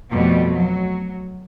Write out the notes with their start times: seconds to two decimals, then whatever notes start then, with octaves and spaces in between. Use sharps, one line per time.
0.10 F2 B2 G3 A3
0.55 F#3